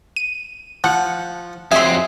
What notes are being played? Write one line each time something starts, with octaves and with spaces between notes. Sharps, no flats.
D#7
F3 F#5
F2 F#3 C4 G#4 E5 C6